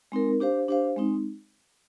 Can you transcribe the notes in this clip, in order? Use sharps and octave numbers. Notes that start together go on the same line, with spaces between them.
G#3 C4 D#4 A#4
D4 G4 C5 F5
D4 G4 C5 F5
G#3 C4 D#4